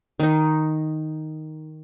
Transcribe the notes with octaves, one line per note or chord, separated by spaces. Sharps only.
D#3 D#4